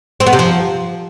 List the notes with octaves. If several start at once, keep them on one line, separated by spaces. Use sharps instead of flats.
C4
B3
C3
F3